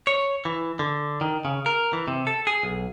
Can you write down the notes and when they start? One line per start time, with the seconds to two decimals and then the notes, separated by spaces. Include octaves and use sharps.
0.07 C#5
0.45 E3
0.79 D3
1.21 D#3
1.45 C#3
1.66 A#4
1.93 E3
2.08 C3
2.27 A4
2.47 G#4
2.63 B1